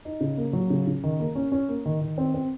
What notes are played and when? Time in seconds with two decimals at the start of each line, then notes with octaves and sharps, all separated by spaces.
0.05 D#4
0.21 C#3
0.37 A#3
0.53 F#3
0.70 C#3
0.87 C#3
1.04 D#3
1.20 A#3
1.35 C#4
1.52 C#4
1.69 A#3
1.86 D#3
2.01 D#3
2.18 C4
2.34 C4